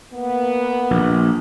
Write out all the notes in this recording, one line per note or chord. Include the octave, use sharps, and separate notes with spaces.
A#3 B3
A#1